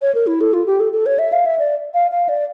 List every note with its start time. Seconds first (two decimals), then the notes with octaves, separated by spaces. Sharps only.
0.02 C#5
0.15 A#4
0.27 E4
0.41 A4
0.53 F4
0.66 G4
0.80 A4
0.93 A4
1.06 C#5
1.19 E5
1.33 F5
1.46 E5
1.59 D5
1.94 F5
2.11 F5
2.29 D5